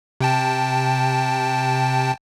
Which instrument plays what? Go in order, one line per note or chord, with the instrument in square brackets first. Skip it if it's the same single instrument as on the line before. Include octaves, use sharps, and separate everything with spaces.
[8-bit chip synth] C3 G5 A5